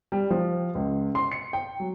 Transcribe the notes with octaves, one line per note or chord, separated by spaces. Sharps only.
G3
F3
C#2
C6
C#7
G5
F#3